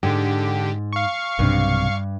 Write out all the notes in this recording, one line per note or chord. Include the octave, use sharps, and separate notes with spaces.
G#2 D3 G4
F5 C#6
B1 G2 C3